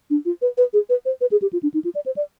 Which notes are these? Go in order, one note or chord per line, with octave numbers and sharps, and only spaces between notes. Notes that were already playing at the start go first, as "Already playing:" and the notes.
D4
F4
B4
B4
G#4
B4
C5
B4
G#4
G4
F4
D4
D#4
F4
D5
C5
D5